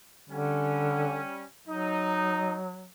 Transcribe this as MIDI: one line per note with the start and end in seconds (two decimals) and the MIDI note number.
0.29 1.22 50
0.29 1.43 55
0.29 1.43 61
1.67 2.87 54
1.67 2.56 63